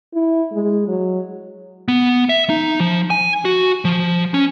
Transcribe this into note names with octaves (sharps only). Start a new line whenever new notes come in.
E4
G#3
F#3
B3
E5
D#4
F3
G#5
F#4
F3
C#4